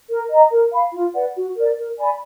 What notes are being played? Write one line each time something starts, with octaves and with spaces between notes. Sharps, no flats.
A#4
D#5 A#5
A#4
F5 B5
F4
B4 D5 F#5
F#4
A#4 D5
A#4
D5 G#5 B5